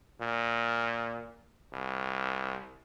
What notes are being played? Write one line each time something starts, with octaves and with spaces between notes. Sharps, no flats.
A#2
C2